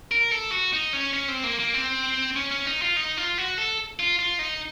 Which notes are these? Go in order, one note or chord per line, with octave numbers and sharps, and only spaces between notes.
A#4
A4
F#4
D#4
C#4
C#4
C4
A#3
A#3
C4
C#4
C#4
D#4
F4
D#4
F4
F#4
A4
F4
F4
D#4